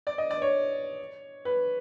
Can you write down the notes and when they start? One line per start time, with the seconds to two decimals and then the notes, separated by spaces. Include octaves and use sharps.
0.07 D5
0.18 D#5
0.30 D5
0.42 C#5
1.45 B4